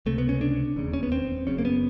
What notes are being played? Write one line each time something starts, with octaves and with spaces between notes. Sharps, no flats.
C#2 C3 A3
B3
C#4
D4
E1 D#2 C#3
C#4
B3
C4
F#1 F#2 C#3 C#4
A#3
B3